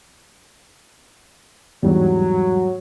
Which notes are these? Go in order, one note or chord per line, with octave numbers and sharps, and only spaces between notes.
E2 G#2 F#3 G3